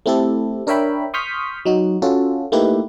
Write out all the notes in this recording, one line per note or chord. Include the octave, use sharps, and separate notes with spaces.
A3 C4 E4 G4 A4
D4 A#4 C#5 E5 G5 B5
C6 C#6 D#6 F6 G6 B6
F#3 D#4 F#4
C#4 F4 F#4 A4
A3 A#3 D#4 E4 G4 B4